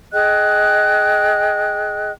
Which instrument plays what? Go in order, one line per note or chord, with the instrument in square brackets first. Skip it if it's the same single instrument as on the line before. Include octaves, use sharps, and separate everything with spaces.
[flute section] G#4 D#5 G5 F#6